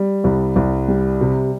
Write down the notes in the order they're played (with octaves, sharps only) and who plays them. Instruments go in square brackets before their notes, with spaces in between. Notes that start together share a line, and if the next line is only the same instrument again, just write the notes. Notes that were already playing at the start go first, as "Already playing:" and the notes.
Already playing: [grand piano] G3
C2
C2
G3
C3